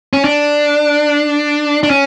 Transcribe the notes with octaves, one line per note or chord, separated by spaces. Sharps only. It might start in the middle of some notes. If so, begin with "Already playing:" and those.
C#4
D4
D4
C#4